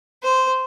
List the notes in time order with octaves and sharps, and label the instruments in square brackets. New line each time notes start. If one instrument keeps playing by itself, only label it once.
[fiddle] C5